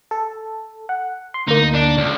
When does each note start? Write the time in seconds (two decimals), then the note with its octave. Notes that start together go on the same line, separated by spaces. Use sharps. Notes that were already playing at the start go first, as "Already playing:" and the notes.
0.11 A4
0.89 F#5
1.34 C6
1.48 D2 A#3 D#4
1.74 D4
1.98 C#2